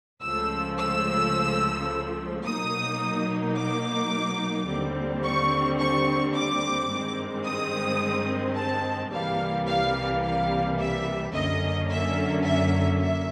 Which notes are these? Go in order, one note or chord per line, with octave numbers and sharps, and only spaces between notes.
C#2 C#3 F3 A3 E6
E6
B2 F#3 A#3 D#4 D#6
D6
D#2 D3 G3 C4
C#6
C#6
D6
G2 D#3 G#3 C4
D#6
A5
C2 C3 E3 G3 A#3 F5
F5
F5
E5
F#2 D3 F#3 A#3 C#4 D#5
E5
E5
E5